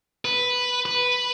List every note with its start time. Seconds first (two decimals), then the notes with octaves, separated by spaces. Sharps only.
0.25 B4
0.86 B4